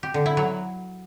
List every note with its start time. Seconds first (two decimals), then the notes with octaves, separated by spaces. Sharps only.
0.03 G4
0.14 D3
0.26 E4
0.37 F#3